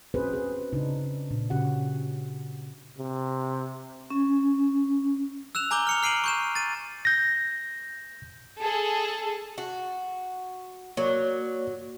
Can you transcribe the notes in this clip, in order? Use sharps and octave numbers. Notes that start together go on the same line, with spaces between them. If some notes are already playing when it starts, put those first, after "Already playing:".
C4 C#4 F#4 G#4 B4 C5
G#4
C#3 D4 D#4
A#2 D4
C#3 C#4 F#4 G4 F#5
C3
C#4
E6 F#6 E7 F7
G#5 A#5 D6 G6 G7
F6 C#7 F7
F6 C7 D7 D#7 F#7
C#6 G6 E7
A6 D#7
G6 A#6
G#4 A4
F#4
F#3 A#3 C#5 D5